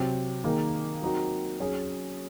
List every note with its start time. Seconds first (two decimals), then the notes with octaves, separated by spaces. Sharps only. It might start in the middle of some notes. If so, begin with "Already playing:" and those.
Already playing: C3 F#3 C4
0.44 D#3 A#3 D#4 G#4
1.02 F#3 C4 D#4 F#4 A#4
1.60 F#3 C#4 G#4